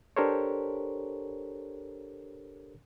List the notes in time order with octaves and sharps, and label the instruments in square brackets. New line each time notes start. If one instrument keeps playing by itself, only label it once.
[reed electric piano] D4 G4 A4 A#4 C5 C#5